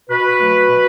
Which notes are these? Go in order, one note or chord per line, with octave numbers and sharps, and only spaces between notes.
B2 F#4 B4
F#3 A3
B2